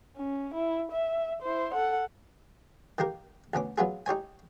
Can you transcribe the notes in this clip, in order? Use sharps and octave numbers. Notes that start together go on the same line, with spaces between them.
C#4
E4
E5
E4 C5
A4 F#5
D#3 A#3 G4 A#4
D2 B2 C#4 D6
F#3 B3 F4 G#4
D#4 G4 C#5 G#5